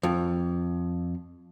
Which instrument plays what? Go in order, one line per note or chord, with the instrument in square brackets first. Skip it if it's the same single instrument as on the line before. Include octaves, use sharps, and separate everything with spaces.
[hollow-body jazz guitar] F2